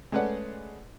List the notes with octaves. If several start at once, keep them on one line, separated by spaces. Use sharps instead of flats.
G#3 A3 C#4 B4 D5 F#5